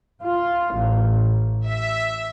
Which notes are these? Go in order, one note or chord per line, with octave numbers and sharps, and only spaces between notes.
F4
A1
E5